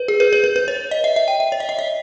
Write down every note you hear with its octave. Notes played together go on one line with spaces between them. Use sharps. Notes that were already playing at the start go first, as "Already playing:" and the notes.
Already playing: B4
G#4
B4
B4
B4
B4
C#5
D#5
E5
E5
G5
E5
C#5
D#5
E5
D#5